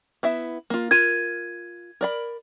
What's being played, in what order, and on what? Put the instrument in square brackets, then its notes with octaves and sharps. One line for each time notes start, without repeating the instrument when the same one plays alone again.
[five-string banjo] B3 E4 E5
A#3 F4
[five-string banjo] F4 A#4 [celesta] G#6 D#7
[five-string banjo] A#4 D5 B5